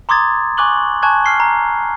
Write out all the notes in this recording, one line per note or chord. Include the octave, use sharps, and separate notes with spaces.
A#5 C6 D6 D#6 G#6 A6
G#5 C#6 D6 F#6 F#7 G7
G#5 A5 C#6 F#6 G#6
F6 C7 G7
A#5